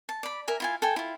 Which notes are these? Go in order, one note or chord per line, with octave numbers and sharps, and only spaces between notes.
A5
D5 B5
A#4 E5 G#5
E4 F4 G#5
A4 G5 G#5
E4 F4